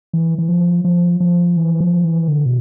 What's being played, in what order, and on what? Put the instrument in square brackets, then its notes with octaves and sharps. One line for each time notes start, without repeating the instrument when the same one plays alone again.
[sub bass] E3
E3
F3
F3
F3
E3
F3
E3
D3
B2